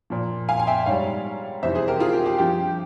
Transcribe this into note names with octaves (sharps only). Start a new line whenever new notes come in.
A#2 F3
F5 G#5
G#5
E5 G5
G#2 G3 C#5 F5
F2 C3 E3 C5 E5
G#4 C5
G4 A#4
F4 G#4
G4
G4
G2 F3 G4